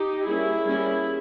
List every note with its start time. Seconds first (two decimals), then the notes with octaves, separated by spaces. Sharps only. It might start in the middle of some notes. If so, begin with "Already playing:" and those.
Already playing: D#4 G4
0.27 G3 A#3 C#4 E4 G#4
0.66 G3 A#3 C#4